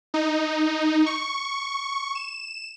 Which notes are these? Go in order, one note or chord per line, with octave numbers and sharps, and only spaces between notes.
D#4
C#6
E7